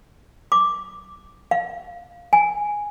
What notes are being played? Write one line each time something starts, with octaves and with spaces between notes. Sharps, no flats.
D6
F5
G#5